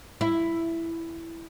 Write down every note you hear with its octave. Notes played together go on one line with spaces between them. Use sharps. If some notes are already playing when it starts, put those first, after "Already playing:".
E4